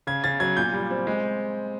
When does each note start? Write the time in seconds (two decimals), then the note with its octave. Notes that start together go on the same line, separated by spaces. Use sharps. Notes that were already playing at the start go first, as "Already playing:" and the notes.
0.07 C#3 G#6
0.24 C#3 A6
0.40 F#3 G#6
0.57 A#2 G6
0.74 G3
0.91 C4
1.07 G#3